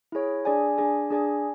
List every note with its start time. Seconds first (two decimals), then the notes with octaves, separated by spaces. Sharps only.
0.12 E4 G#4 C#5
0.45 D4 G#4 D5 G#5
0.78 D4 G#4 D5 G#5
1.10 D4 G#4 D5 G#5